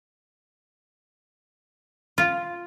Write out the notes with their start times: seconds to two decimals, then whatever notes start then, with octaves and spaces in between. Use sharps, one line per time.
2.18 F4